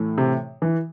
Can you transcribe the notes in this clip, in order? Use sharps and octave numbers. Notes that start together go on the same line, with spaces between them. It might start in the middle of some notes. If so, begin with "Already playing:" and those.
Already playing: A2 E3 A3
C3
E3